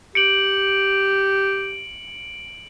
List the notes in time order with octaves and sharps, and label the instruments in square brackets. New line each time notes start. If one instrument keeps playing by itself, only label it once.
[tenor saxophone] G4 [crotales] C#7 D7 F#7